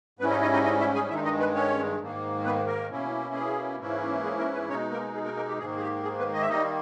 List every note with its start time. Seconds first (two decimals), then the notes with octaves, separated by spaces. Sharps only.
0.19 G#2 G3 B3 C#4 E4 B4
0.31 D#4 D#5
0.42 D#4 D#5
0.53 D#4 D#5
0.65 D#4 D#5
0.80 E4 E5
0.95 G#4 G#5
1.09 G2 D#3 G#3 D#4 E4 E5
1.24 D#4 D#5
1.39 B3 B4
1.54 C#4 C#5
1.99 G#2 D#3 A#3
2.44 B3 B4
2.67 A#3 A#4
2.90 B2 A#3 C#4 E4
3.34 G#4
3.79 G#2 E3 A#3 C#4 E4
4.24 G#4
4.38 A#3 A#4
4.54 B3 B4
4.68 B2 G#3 C#4 D#4 C#5
4.91 A#3 A#4
5.14 G#4
5.25 A#3 A#4
5.36 A#3 A#4
5.48 G4
5.58 G#2 D#3 A#3 G#4
5.77 G#4
5.81 G4
6.03 G#4
6.18 B3 B4
6.34 D#5
6.41 E5
6.48 D#3 G3 A#3 D#4 D#5